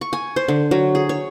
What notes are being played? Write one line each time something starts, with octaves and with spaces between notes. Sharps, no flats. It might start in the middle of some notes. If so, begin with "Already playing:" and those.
C#6
G#5
C5
D3
F#3
G#4
C#5